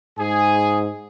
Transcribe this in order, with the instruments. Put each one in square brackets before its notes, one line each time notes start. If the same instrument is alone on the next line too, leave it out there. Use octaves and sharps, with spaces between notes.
[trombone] G#2 [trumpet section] G#4 G#5